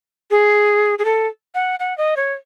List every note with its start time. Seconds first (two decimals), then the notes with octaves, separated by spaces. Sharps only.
0.31 G#4
0.99 G#4
1.05 A4
1.55 F#5
1.80 F#5
1.98 D#5
2.17 C#5